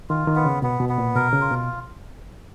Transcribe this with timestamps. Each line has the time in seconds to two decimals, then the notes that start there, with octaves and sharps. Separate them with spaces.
0.09 D#3 F4
0.27 D#3
0.36 B3
0.45 C#3
0.62 B2 B3
0.80 B2
0.89 B3
0.98 A#2
1.16 B2 A#4
1.33 C#3
1.41 F4
1.51 B2